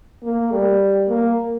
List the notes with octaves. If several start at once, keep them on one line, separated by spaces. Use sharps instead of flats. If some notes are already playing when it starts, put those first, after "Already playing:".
A#3
G3
A#3